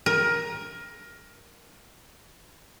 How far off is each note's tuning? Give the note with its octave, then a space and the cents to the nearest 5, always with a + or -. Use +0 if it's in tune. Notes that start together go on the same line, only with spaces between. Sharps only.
A#4 +15